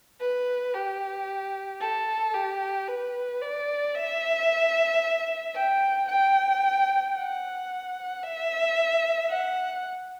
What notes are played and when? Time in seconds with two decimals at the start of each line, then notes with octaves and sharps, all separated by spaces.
0.20 B4
0.74 G4
1.81 A4
2.34 G4
2.88 B4
3.42 D5
3.95 E5
5.55 G5
6.08 G5
7.15 F#5
8.23 E5
9.30 F#5